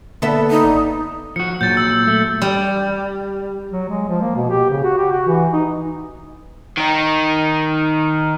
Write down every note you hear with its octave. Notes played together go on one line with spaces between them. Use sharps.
D3 A#3 B3 A4 E5
D#4
G#1 D5
F3 F#4 C#7
A#2 F#3 G6 A6
E6
A3
G3
F#3
G#3
F3
A#3
B2
G4
C#3
F#4
G4
F#4
E3
D#4
D#3 D#4